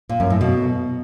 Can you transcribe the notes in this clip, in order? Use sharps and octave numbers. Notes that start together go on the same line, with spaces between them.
A#2
F#2
A2
B2